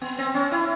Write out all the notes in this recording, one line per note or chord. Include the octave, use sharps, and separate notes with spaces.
B3
C4
C#4
E4